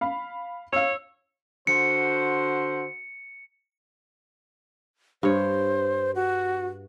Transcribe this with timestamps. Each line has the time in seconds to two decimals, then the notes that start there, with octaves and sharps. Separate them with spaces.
0.01 F5 B5
0.73 C#5 F5 E6
1.67 D3 F#4 C5 C#7
5.23 G2 C5 C#5
6.15 F#4